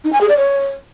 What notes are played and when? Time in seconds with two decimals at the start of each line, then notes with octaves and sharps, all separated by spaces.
0.04 D#4
0.13 G#5
0.21 G#4
0.29 D5
0.37 C#5